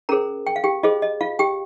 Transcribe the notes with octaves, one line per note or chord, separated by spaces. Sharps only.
C#4 G#4 A#4 C5 A#5
G5
F5
G4 G5
F4 G#4 C5 D#5
D#5
F4 F5
G4 G5